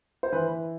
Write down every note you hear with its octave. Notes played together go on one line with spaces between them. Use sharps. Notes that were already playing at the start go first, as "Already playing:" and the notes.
C5
E3 B4